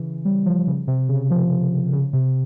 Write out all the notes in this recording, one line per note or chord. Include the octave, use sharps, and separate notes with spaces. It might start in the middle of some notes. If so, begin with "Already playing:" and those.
Already playing: C#3 E3
G3
F3
C#3
C3
C#3
F3
C#3
C3